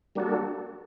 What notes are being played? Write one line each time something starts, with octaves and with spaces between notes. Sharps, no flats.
G3 A#3 D4 F#4 A4